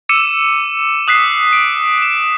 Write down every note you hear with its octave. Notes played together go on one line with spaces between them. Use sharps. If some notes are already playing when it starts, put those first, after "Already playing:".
D6 E6 C#7 D#7 E7
D#6 F#6 B6 C7
D7
F#6 E7